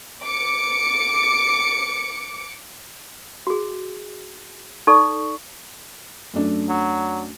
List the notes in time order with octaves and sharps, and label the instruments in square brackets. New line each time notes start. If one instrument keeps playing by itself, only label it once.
[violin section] D6 C#7
[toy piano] F#4 G#4
D#4 A4 D5 C#6
[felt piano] F#2 A3 D4
[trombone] F#3